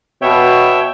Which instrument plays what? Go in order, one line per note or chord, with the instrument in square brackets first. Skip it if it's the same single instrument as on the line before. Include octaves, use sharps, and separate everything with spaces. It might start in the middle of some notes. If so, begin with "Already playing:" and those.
[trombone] B2 [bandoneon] C#5 E5 G5